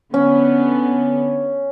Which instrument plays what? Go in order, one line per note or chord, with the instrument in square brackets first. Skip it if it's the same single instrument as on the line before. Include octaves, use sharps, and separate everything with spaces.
[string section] D3 B3 [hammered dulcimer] C#4